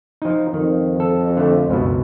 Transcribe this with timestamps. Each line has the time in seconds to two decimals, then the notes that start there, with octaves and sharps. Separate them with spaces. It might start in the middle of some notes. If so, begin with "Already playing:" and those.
0.22 F3 D#4
0.54 F2 D#3
1.00 A4
1.37 D3 A3
1.69 C#2 F#2 B2